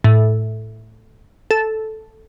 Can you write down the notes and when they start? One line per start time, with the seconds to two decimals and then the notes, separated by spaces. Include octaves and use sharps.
0.04 A2
1.51 A4